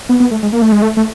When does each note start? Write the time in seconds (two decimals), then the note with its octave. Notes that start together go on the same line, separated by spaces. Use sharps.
0.09 B3
0.20 B3
0.31 A3
0.43 G#3
0.52 A#3
0.62 A3
0.72 G#3
0.82 A3
0.97 A3